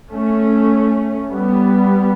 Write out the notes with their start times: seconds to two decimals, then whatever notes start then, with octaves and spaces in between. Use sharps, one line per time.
0.12 A3 C#4
1.30 G3 B3